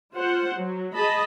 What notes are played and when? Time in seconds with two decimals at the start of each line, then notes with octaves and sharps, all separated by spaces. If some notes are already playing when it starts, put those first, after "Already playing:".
0.15 F4 C5 F#5
0.56 F#3
0.94 G#4 D#5 A5 B5